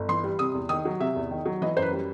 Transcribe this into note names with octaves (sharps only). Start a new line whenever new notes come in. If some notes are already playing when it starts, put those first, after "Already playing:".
Already playing: G1
E3 C6
G3
C3 D#6
E2
D#3 D#6
F#3
C3 E5
E2
D#3
F#3
E3 D#5
F#2 C5
B4
G3